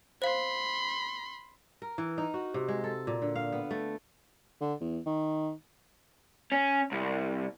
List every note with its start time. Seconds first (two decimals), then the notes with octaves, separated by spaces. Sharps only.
0.22 C5 F5 B5 C6
1.82 A#4
1.98 E3
2.18 D#4
2.34 F#4
2.54 C3
2.68 G#3
2.84 A4
3.07 A#2
3.22 D3
3.36 F5
3.52 B3
3.71 A3
4.61 D3
4.81 E2
5.06 D#3
6.52 C#4
6.92 C2